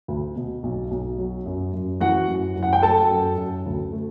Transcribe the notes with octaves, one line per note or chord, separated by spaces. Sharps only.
D2
B2
B1
B1
F#3
F#2
F#2
E3 F#4 F#5
F#2
F#2
F#5
G5
F#3 A4 A5
F#2
F#2
D2
A3